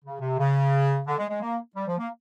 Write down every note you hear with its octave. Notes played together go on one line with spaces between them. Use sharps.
C#3
C3
C#3
D3
G#3
G#3
A#3
G3
F3
A#3